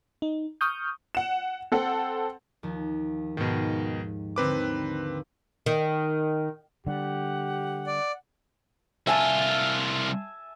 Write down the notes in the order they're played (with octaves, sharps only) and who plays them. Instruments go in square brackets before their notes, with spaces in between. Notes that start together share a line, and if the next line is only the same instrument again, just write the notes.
[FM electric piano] D#4
C#6 D#6 F6 G6
[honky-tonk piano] F#5 E7
C4 A4 F#5
[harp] D#2 F3
[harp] G#2 C#7 D#7 [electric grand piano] B2 D#3
[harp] D#2 D3 [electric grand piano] C4 B4 D6
[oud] D#3
[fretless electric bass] D3 G3 [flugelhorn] G4 [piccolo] F#5
[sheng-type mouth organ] D5
[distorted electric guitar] C2 F4 [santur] E5 G#5 A5